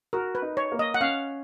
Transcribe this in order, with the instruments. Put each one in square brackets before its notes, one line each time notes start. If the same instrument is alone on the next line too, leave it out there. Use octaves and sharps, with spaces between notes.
[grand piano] F#4 [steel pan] A#4
[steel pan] B4
[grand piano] D#4
[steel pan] C#5
[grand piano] A#3
[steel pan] D#5
F#5
[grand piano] C#4 [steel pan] F5